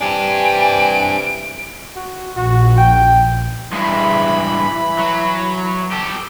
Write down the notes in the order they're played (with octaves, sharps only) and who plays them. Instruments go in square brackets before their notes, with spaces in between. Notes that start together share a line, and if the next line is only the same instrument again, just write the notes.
[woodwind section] C3 E3 [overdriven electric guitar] D4 G4 [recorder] G#5 [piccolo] D7
[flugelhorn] F#4
[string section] A#1 [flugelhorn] F#4
[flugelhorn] G5
[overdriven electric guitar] G2 G#3 [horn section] E3 B5
[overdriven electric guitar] F#3
G4 A4